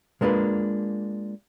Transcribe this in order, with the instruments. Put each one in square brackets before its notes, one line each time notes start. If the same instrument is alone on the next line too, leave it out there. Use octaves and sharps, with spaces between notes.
[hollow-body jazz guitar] G#3 A#3 D4 F4 B4